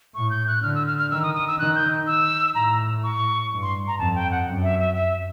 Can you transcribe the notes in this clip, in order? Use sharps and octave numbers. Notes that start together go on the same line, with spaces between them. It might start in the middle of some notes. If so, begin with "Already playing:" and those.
A2 C#6
G6
F#6
D3 F6
E6
F6
F6
D#3 E6
D#6
D#6
E6
D#3 F#6
G6
E6
A2 A#5
C#6
G2
C6
A#5
F2 A5
G5
F#5
F#2
E5
E5
E5